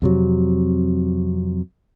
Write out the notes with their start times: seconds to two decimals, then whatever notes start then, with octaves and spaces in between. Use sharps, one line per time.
0.02 F2 C3 F#3